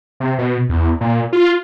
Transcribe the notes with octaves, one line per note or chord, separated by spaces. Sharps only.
C3
B2
E2
A#2
F4